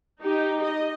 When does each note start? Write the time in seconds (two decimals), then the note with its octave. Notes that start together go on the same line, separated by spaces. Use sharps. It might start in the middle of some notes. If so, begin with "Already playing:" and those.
0.20 D#4 G4
0.63 D#5